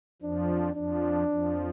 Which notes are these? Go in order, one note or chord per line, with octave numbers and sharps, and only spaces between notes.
F2 F3 D4
F2 F3 D4
F2 F3